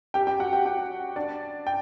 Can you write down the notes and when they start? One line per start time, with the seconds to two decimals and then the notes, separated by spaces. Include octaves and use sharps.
0.14 G4 G5
0.27 G4 G5
0.40 F#4 F#5
0.53 G4 G5
0.66 G4 G5
1.16 D4 D5
1.67 G5